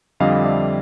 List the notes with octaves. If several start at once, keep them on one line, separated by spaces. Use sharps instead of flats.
F2 D3 G3 D#5 F5
D5 E5